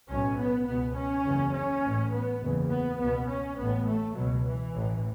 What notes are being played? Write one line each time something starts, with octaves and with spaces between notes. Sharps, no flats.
B1 A2 C#4
B3
C#2 B2 B3
C#4
F#1 E2 C#3
C#4
A1 A2
B3
F#1 E2 C#3
B3
C#2 B2 B3
C#4
A1 A2 B3
A3
C#2 B2 F#3
E3
A1 A2